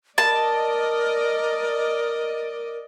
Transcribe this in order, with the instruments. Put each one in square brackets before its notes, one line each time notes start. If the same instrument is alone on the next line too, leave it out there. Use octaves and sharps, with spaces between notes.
[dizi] A#4 [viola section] D5 D#5 [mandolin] A5